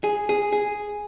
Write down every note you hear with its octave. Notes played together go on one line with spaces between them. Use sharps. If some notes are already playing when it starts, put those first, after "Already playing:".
G#4
G#4
G#4